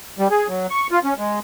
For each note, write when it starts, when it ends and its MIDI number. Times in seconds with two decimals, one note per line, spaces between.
0.19 0.28 55
0.31 0.47 68
0.48 0.67 54
0.70 0.87 85
0.91 0.99 65
1.04 1.14 61
1.18 1.39 56